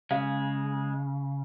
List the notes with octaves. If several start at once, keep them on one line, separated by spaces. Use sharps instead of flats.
C#3 G#3 F5